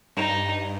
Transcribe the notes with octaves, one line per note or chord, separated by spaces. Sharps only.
G2 D#4